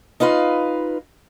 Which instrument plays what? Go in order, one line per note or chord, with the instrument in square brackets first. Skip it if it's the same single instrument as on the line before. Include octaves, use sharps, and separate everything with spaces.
[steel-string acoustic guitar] D#4 F4 B4 F5